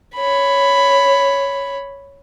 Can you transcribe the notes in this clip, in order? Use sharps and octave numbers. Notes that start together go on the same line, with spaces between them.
C#5 B5